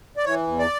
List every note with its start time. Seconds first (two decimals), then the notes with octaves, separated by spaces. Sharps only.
0.17 D5
0.24 E3 C#5
0.47 E2
0.59 D5